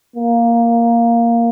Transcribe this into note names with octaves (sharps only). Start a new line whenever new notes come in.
A#3